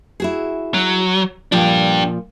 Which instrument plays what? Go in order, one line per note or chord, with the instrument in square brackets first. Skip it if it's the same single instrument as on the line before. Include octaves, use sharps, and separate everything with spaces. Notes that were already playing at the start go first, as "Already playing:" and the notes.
[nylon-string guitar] E4 F#4 G#4
[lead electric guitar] F#3
[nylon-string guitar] A#2 F3 F4 [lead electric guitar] D4 G4